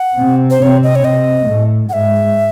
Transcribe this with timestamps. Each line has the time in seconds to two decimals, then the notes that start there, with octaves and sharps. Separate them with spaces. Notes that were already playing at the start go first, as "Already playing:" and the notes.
Already playing: F#5
0.18 C3 C4
0.50 C5
0.62 C3 C4 C#5
0.83 D#5
0.95 C#5
1.04 C3 C4 D#5
1.46 A2 A3
1.88 G#2 G#3 F#5
1.93 E5